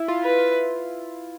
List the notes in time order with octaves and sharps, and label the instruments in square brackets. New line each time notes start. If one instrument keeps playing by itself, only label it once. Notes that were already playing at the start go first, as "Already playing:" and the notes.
Already playing: [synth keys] E4
F4
[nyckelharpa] B4
[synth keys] F4